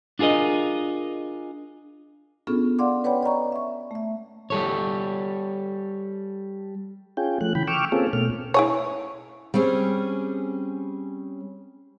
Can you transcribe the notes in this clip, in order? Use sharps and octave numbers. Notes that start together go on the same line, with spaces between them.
D4 F4 G#4 A#4 D#5
B3 C#4 D4 F4 G#4 A4
D5 F5 F#5 C6 D6
B4 C#5 D5 F#5 G5 B5
D5 D#5 A#5 C#6
E5 C#6
A3 E5
G3 A4 C#5
C#4 F4 G#4 G5
F3 A3 F#6
C#3 E3 G5 B5
G5 C#6 D6 E6 F6
A#3 C4 C#4 F4 G#4 A4
B2 A3 F6
E4 G#4 C#5
G3 C4 C#4 G#4